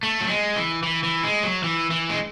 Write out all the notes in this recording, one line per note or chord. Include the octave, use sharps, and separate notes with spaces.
A3
F#3
G#3
E3
E3
E3
G#3
F#3
E3
E3
G#3